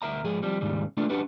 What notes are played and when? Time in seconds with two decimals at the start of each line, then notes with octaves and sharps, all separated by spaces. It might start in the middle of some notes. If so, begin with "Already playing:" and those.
0.02 D2 A#4 E5 A#5
0.24 G#2 F3 G#4
0.42 F3 G3 C4
0.61 D#2 G#2 C#3 G3
0.97 A3 B3 D4 F4 A4
1.10 C#4 D4 F#4 G4 B4